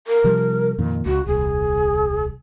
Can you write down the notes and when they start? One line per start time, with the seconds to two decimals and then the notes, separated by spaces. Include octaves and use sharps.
0.07 A#4
0.24 C3 F3 G3
0.78 F2 A#2 D#3
1.06 C#2 F#4
1.26 D#1 C2 G#4